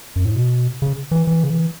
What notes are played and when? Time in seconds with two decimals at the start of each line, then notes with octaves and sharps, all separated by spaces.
0.16 F#2
0.25 A2
0.35 B2
0.82 C#3
1.11 E3
1.27 E3
1.43 C#3
1.50 E3